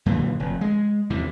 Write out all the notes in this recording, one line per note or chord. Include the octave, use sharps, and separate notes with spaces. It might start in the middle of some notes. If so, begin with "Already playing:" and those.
F#2 A#2 D3 E3
F1
G#3
E2 C3 E3